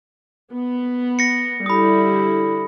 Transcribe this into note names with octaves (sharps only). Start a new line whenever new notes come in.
B3
A#6 C#7
D3 G3 E4 B5 D#6